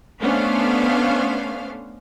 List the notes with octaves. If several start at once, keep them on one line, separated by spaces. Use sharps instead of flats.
A3 B3 C#4 D4 C5 F5